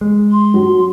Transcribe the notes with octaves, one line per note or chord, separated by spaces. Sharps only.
G#3
C6
F#3